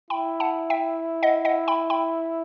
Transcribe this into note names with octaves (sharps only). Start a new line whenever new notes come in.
E4 G5 B5
F#5 A5
E5 G5
D#5 F#5
D#5 F#5
G5 B5
G5 B5